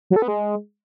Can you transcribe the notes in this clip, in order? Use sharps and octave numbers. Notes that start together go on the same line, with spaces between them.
F#3
A4
B3
G#3